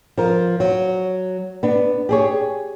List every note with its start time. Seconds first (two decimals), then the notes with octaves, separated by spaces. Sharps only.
0.17 F3 A#4
0.60 F#3
1.63 B3 D4
2.09 G4 G#4 C#5